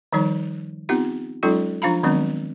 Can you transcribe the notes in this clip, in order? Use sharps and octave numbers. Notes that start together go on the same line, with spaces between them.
D#3 F3 G3 D#4 C#5
B3 C4 D#4 F4 G4
F#3 G#3 C#4 D#4 F4 A4
F3 D4 F4 F5 A#5 B5
D#3 F#3 G#3 B3 C4 D4